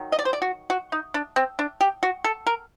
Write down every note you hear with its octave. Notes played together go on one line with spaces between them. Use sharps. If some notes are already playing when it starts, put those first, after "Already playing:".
Already playing: D#3 F#3
D#5
D5
C5
D5
F#4
F#4
D#4
D4
C4
D4
G4
F#4
A4
A#4